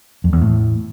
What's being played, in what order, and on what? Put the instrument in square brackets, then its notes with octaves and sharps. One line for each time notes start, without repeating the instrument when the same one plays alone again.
[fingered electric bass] F2
E2
A2